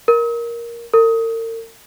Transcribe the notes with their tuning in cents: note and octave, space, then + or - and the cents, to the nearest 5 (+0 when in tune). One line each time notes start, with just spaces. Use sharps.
A#4 +10
A#4 -45